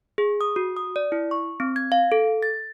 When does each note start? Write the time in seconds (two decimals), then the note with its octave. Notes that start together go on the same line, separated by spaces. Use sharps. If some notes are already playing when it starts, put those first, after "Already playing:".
0.18 G#4
0.41 D#6
0.56 F#4
0.76 D#6
0.96 D5
1.12 E4
1.31 C#6
1.60 C4
1.76 G#6
1.92 F5
2.12 A4
2.43 A6